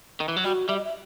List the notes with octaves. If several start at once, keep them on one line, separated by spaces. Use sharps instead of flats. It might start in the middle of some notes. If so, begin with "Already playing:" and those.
D#3
E3
F#3
G3 F#4
G3 E5
D#5
E5